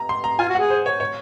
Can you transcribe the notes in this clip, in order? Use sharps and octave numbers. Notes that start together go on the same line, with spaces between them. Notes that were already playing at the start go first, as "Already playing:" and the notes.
Already playing: A#5
C6
A#5
F4 G#5
F#4
G#4 F#5
C5
C#5
C#5